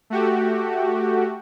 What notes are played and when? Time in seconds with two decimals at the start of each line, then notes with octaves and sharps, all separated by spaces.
0.10 A3 F#4 G4